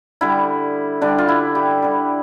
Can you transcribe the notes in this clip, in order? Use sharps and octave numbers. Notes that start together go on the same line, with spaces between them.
D3 G3 E4
D3 G3 D4
F4
E4
G4
D3 G3